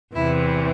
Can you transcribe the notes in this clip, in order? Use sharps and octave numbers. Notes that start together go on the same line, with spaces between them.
E2 C3 E3 E4